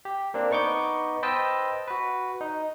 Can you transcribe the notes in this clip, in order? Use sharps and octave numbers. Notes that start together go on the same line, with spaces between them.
G4
A#3 C4 D4
B3 D#4 C#6 D6 G6
B4 C5 D#5 G5 A5 E6
F#4 B4
D#4